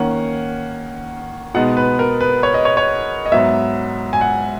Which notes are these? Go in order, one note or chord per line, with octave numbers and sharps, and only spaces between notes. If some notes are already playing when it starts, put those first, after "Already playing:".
Already playing: D#3 A#3 C#4 F#5
B2 G#3 B3 D#4 F#5
B4
A#4
B4
C#5
D#5
C#5
C#5
D#5
G#2 F#3 B3 E5
G#5
F#5